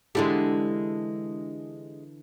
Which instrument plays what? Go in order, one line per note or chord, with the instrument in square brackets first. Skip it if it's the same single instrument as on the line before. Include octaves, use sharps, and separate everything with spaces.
[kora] D3 E3 A4 [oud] G#3 D4 G4